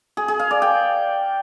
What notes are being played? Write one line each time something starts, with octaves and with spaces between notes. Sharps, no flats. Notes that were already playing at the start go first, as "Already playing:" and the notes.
G#4
G#4
F5
D5
G5